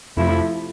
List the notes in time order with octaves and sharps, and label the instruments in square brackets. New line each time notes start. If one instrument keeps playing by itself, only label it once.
[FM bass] F2 [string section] C3 F3 A3 E4